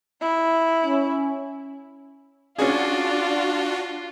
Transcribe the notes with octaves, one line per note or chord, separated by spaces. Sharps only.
E4
C#4
C#4 D4 F4 F#4 G#4 D5